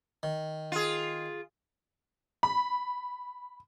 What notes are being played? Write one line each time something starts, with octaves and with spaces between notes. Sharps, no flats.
D#3
F4 G#4
B5